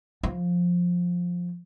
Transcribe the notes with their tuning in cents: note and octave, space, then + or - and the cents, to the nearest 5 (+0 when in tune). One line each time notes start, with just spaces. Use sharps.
F3 +10